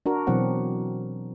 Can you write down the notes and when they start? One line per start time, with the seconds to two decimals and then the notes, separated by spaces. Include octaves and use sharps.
0.06 D4 F#4 A#4
0.27 B2 E3 F#3 C4 F#5